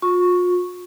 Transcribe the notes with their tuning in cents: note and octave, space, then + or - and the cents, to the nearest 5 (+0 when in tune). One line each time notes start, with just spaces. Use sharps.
F4 +40 C#6 +0